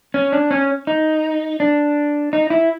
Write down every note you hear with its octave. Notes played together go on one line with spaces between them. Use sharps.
C#4
D4
C#4
D#4
D4
D#4
E4